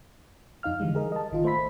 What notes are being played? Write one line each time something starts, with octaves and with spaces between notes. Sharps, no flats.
F2 D#4 F5 F6
D3 E3 G3 G#3
G#4 A#4 D#5
D#5 A5
A1 D#3 F4
A3 C5 E5 B5 B6